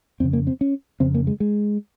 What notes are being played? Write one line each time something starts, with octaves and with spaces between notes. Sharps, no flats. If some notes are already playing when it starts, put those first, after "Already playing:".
F2 C#3 C4
A#3
C4
C#4
F2 C#3 C4
A#3
G#3
G#3